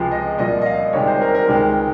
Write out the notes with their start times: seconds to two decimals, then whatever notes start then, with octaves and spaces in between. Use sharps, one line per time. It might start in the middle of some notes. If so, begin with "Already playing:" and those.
Already playing: C#2 C3 F3 G#3
0.11 D#5
0.38 C2 A#2 F3 D#5
0.61 D#5
0.66 F5
0.93 C2 C3 D#3 G#3 C#5
1.07 C5
1.21 A#4
1.35 A#4
1.48 C#2 C3 D#3 G#3